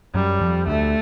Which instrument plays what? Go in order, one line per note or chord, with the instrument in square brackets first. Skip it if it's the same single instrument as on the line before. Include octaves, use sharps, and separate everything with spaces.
[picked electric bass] F#2 F#3 [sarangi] G3
[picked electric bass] F2 F3
[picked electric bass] D2 D3 [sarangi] A3